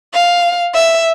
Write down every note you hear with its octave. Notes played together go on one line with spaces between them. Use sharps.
F5
E5